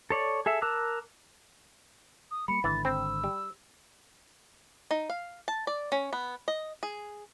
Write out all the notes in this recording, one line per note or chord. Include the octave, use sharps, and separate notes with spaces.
A4 C#5 D5
G#4 A4 E5
A#4 A5 D6 E6 F#6
D#6
G3 A#3 B5 C#7
G#1 D3 E3 A6
C4 E6
G3
D#4
F5
A5
D5
C#4
B3
D#5
G#4